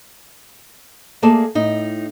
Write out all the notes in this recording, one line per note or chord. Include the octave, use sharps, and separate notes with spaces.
A3 A#3 G#4 A4 D5 A5
A2 D#4